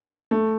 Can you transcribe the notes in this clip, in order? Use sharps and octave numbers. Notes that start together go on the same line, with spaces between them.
A3